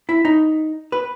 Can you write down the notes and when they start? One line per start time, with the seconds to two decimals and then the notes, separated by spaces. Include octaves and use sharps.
0.09 E4
0.25 D#4
0.92 B4